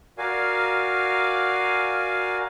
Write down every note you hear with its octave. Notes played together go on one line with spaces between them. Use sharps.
F#4 A#4 D5 F5 G#5